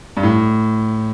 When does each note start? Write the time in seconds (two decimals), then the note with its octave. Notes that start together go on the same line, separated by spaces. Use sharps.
0.17 G2
0.23 A2